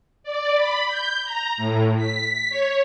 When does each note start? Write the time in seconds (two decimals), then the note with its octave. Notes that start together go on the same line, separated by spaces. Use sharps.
0.24 D5
0.55 B5
0.87 G6
1.25 A#5
1.57 A2
1.97 B6
2.50 C#5